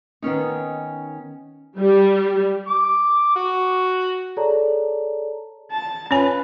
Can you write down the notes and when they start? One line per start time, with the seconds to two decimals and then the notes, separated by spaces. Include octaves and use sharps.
0.22 D#3 B3 C#4 D#4
1.78 G3
2.68 D6
3.35 F#4
4.37 G#4 A4 C#5 D5 A5 A#5
5.71 A5
6.11 C#4 F4 B4 C#5 G#5